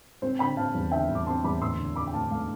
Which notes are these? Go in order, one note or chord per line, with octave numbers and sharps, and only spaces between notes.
C4 C5
D3 G5 B5
C4 F5 A5
E2
D3 E5 G5
E2
D6
C4 A5 C6
E2 B5 D6
D2 C6 E6
D3
D3 B5 D6
G5
D2 F5 A5
A3 F5 A5